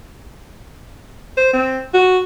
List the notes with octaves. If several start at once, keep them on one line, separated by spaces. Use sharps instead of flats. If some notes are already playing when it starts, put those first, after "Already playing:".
C5
C4
F#4